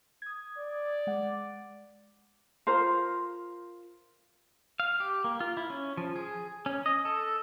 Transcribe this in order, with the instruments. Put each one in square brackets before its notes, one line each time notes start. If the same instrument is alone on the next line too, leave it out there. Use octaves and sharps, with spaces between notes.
[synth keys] D#6 G#6
[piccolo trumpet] D5
[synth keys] G#3 F#5
[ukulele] F4 A#4 C5
[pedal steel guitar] F5
G4
A#3
F4
E4
C#4
F3
G#4
C#4
D#5
A4